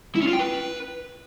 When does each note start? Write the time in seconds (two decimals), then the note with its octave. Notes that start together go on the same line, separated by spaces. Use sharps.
0.15 E4
0.21 C#4
0.27 F4
0.33 G5
0.39 B4